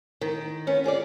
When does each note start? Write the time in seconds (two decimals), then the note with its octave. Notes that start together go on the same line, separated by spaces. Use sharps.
0.21 D#3
0.67 B3 C#4
0.84 F4 G#4 C5 D5